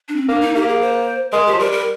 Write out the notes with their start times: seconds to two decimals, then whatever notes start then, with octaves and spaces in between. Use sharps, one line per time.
0.09 D4
0.16 C4
0.28 A#3 D4
0.41 D#4
0.55 A#3 G4
0.68 G#4
0.81 C5
1.32 G#3 A#4
1.46 G4
1.53 F3
1.59 G3 A#4
1.72 A#4